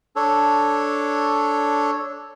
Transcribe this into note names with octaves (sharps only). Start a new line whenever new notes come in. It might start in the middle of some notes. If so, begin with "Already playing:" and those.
D4 A4 C#5